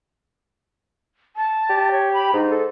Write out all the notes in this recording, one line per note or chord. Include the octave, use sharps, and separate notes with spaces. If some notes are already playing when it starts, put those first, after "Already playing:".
A5
G4
C#5
B5
G#2 D#4
A4